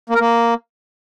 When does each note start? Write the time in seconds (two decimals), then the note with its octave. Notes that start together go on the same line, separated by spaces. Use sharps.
0.10 A#3
0.15 A#4
0.20 A#3